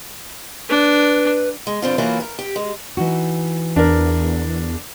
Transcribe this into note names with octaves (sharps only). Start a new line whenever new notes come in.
D4 B4
G#3
G2 D3 C4 F4
E3 F#3 A#3 C#4 E4 F4
A#4
G4
G#3
E3 D#4 F#4
E2 D4 A#4